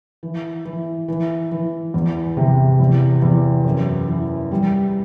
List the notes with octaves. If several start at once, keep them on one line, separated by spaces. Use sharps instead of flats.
E3
E3
E3
E3
E2
C3
E2
E2
F#2
E3
G3